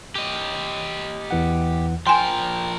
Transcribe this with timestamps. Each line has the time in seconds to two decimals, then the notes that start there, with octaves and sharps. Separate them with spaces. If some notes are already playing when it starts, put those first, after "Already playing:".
0.15 G4 D#5
1.31 E2 E3 F#5
2.07 F3 A#4 G5 G#5 C6